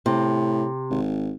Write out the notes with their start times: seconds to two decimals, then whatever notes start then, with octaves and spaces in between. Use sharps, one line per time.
0.06 A2 C3
0.90 G#1